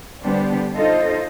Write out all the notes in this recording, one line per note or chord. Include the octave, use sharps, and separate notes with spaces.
D3 G3 B3 D4 G4 C5
D#4 F4 A4 C5 D#5